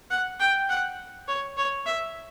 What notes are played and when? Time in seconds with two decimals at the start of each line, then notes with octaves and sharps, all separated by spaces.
0.10 F#5
0.40 G5
0.69 F#5
1.28 C#5
1.57 C#5
1.86 E5